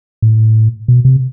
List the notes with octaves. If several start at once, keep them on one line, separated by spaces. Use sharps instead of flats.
A2
B2
C3